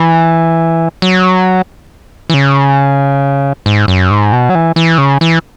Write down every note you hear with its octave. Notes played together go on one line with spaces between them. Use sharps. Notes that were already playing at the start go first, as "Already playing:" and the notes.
Already playing: E3
F#3
E3
C#3
G#2
F#2
G#2
B2
F#3
E3
E3
C#3
E3